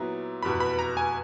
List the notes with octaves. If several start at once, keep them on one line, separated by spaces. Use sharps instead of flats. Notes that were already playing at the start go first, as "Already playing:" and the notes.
Already playing: A#2 F#3 B3 E4 A#5
F1 E2 B2 B5
B5
A#5
G#5